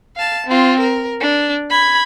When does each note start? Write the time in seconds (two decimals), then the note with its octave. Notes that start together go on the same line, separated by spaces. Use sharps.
0.16 F5 A5
0.47 C4 F4
0.80 A#4
1.21 D4
1.69 B5 G#6